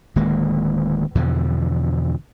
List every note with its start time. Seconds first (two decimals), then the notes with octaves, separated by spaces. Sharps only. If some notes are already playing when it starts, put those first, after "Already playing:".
0.16 D1 D#3 G#3 A#3
1.15 E2 B2 D3 F3